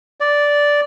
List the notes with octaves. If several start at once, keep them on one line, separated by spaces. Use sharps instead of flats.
D5